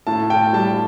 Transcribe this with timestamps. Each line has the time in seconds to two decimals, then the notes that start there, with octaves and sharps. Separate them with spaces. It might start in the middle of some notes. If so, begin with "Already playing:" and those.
0.07 A2 A5
0.30 G5
0.53 G3 A5